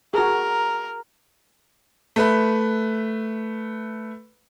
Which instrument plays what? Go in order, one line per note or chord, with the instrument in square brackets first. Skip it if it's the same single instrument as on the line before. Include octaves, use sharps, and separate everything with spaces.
[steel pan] F#4 G#4 [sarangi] A#4
[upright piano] A3 B4 B5